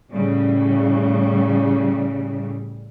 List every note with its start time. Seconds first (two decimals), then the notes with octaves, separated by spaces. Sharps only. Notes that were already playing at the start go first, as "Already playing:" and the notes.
0.11 A2 C#3 G3